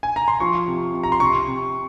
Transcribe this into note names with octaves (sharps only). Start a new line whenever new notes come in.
G#5
A#5
C6
F3 C#6
C3
C3
A#5
C6
C3 C#6
C3